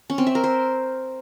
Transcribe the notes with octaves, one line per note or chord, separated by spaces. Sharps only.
C#4
C4
E5
A#4
C5